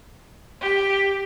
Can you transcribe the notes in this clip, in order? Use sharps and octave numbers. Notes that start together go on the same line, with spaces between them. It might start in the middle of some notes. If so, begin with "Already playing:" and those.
G4